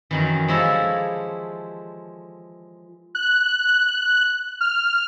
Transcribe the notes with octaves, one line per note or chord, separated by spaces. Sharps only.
F#2 D#3 E3
F3 G#3 E4 G4 A4 C#5
F#6
F6